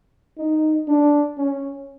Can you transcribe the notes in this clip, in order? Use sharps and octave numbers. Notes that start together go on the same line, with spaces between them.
D#4
D4
C#4